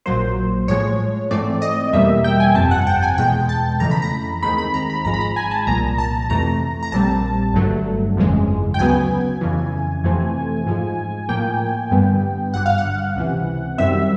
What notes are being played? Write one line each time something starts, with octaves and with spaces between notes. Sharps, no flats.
A#1 A#2 F#3 A#3 C5
A2 F3 G#3 C#5
G#2 E3 A3 C4 D5
D#5
E2 B2 G3 A#3 E5
G5
G#5
G1 F2 C3 A5
F#5
G5
G#5
E2 B2 G#3 G5
A5
F2 C#3 E3 A3 A#5
B5
A#5
D#2 D#3 G#3 C4 B5
B5
A#5
B5
G#1 G#2 F3 G#3 A#5
B5
A#5
G#5
A5
C2 A#2 F3 A#5
A5
F2 C3 E3 A3 A#5
A#5
A#1 A#2 G3 C4 A5
G1 G2 D3 F#3 A3
G1 F2 C#3 E3 G#3
G5
D2 C#3 F#3 B3 G#5
F2 C#3 E3
F2 C3 E3 A3 C4
G#2 F3 G#3
A2 F3 A#3 G5
G2 D3 G3 B3
G#1 G2 D3 F#5
F5
F#5
C#2 C3 E3
F#2 D#3 G3 C4 E5